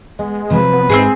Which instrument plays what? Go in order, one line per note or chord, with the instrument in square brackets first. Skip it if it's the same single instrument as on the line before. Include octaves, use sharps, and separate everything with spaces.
[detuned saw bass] G#3 [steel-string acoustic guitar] B3
[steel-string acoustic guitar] C3 F3 F#3 [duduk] B4
[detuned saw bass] B3
[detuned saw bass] G#2 [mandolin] C4 F#4 G#4